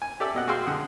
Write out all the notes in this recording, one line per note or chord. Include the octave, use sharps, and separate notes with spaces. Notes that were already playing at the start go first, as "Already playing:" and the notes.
G#5
G4 A4 D5 E5 E6
B2 D#5 F#5
F#4 G#4 F5 G5 C6 E6
D3 F#5 D#6